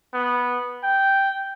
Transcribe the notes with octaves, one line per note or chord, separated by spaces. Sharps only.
B3
G5